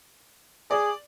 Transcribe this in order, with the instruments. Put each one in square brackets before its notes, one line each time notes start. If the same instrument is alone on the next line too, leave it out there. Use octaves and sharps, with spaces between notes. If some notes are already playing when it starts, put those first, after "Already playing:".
[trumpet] G#4 [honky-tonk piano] D5